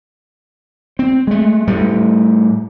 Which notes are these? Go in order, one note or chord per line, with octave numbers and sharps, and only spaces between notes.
C4
G#3 A3
A2 G3 A3